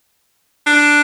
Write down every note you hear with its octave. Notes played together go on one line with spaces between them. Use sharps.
D4